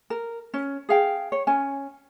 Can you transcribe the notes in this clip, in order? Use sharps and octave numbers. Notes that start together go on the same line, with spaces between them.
A#4
C#4
G#4 F5 G5
C#5
C#4 G#5